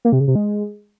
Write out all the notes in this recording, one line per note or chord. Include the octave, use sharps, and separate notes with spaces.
A#3
C3
C#3
C3
G#3